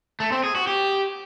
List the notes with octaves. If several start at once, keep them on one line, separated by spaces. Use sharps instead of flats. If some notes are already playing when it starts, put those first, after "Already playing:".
A3
C4
G#4
F#4
G4